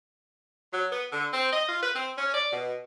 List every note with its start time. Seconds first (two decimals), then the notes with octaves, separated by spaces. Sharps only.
0.73 F#3
0.92 B3
1.12 D3
1.33 C4
1.53 D#5
1.69 F4
1.83 B4
1.95 C4
2.18 C#4
2.34 D5
2.52 B2